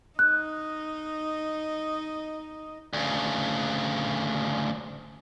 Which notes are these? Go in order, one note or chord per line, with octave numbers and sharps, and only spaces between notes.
D#4 D#5 F#6
D2 C#3